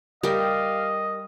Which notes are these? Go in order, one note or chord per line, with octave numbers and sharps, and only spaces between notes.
G3 G4 A#4 D#5 F5 G5